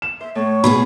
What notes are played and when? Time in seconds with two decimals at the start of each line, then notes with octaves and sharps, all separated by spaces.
0.02 E7
0.21 C5 E5
0.35 A2 C#5
0.64 B2 B3 G#4 B5